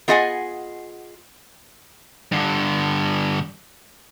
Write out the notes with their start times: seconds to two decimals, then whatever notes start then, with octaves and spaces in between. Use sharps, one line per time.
0.08 B3 F4 G#4 D#5 F#5 G#5
2.32 G2 D3